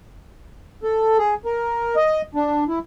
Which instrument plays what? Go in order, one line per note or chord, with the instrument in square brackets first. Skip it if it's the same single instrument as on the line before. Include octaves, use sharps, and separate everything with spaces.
[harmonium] A4
G#4
A#4
D#5
D4
E4